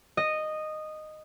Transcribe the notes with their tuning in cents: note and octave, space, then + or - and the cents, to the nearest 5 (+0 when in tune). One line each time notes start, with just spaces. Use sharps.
D#5 -10